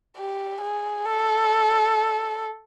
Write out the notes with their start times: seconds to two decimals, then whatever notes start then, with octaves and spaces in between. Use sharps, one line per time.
0.17 G4
0.61 G#4
1.06 A4